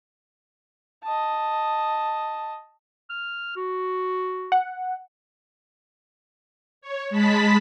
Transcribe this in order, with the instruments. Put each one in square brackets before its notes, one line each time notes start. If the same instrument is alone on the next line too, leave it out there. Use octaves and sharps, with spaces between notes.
[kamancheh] D#5 A5
[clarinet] F6
F#4
[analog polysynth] F#5
[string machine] C#5
G#3 A5 B5 B6